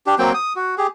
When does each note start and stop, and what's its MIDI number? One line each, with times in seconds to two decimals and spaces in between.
0.06 0.15 62
0.06 0.15 67
0.19 0.33 54
0.19 0.33 58
0.19 0.33 60
0.19 0.33 79
0.34 0.53 87
0.56 0.75 66
0.78 0.87 67
0.78 0.87 68